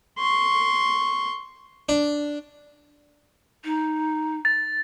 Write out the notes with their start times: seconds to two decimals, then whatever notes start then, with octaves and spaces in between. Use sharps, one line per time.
0.18 C6 C#6
1.89 D4
3.65 D#4
4.45 A6